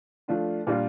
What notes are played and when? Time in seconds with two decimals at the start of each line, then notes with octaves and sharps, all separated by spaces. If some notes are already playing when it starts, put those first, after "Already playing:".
0.28 F3 A3 D4 F4
0.67 A#2 G3 D4 F4